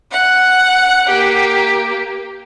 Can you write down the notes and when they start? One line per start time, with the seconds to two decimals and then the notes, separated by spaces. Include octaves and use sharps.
0.12 F#5
1.09 A#3 G4